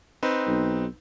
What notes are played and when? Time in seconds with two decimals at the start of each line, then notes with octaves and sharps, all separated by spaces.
0.23 C4 D#4 B4
0.47 B1